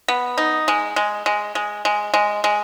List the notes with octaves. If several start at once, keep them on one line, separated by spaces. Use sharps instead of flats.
B3
D#4
G#3
G#3
G#3
G#3
G#3
G#3
G#3